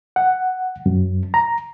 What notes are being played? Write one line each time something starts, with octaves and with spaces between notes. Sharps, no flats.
F#5
F#2
A#5